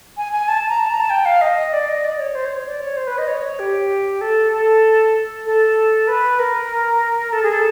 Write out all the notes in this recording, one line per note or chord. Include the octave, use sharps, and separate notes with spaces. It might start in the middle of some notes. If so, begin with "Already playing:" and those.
G#5
G#5
A5
A#5
A5
A#5
A5
G5
F5
D#5
D5
D#5
D5
C#5
C5
C#5
D5
C#5
C5
B4
D#5
C#5
G4
A4
A4
A4
B4
A#4
A4
G#4
A4